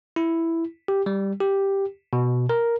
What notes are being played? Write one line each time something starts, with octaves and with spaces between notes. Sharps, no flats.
E4
G4
G3
G4
B2
A#4